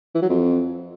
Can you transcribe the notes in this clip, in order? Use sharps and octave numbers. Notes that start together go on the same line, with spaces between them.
E3
F#3
F2